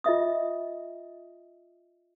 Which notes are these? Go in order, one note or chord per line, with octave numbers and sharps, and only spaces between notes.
F4 D#5 E5 D#6